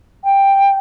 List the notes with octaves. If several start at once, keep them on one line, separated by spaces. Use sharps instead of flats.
G5